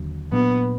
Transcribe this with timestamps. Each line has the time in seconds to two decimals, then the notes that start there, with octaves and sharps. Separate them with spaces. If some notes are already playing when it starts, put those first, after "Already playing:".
Already playing: D#2 D3 F#3
0.33 A#2 F#3 B3 D4